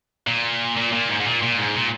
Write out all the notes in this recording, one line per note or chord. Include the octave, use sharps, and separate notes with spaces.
A#2
A#2
A#2
G#2
G#2
A#2
A#2
G#2
A#2